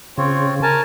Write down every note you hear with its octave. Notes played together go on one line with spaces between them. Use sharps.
C#3 C4 F4 C#5
A#4 G#5 A5